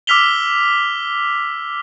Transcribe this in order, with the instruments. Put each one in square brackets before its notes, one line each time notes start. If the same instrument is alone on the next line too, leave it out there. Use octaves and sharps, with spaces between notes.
[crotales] D6 E6 F6 B6 F7 G7